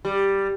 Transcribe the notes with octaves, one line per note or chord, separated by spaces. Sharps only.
G3